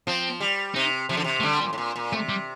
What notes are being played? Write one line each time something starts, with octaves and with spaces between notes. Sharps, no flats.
F3 C4
G3
C3 D#4
C3 F3
D3
C3
A3
D3 G3
A#2
A2
A#2
A#2
C3 A3
G3